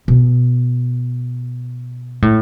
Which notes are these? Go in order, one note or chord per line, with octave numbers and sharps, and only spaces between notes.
B2
A2